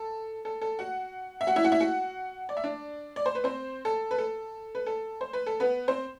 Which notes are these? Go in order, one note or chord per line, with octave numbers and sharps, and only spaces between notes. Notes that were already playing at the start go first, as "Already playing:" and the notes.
Already playing: A4
A4
A4
F#4 F#5
E5
F#4 F#5
E4 E5
F#4 F#5
E4 E5
F#4 F#5
D5
E5
D4 D5
D5
C5
B4
C4 C5
A4
B4
A4
B4
A4
C5
B4
A4
B3 B4
C4 C5